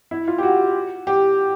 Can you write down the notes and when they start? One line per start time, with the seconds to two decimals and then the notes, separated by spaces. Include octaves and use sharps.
0.11 E4
0.28 F4
0.38 G4
0.43 F#4
1.07 G4